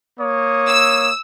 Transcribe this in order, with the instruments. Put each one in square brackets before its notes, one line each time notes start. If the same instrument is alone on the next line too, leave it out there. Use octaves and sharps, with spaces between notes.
[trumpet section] A#3 C#5 D#6
[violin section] E6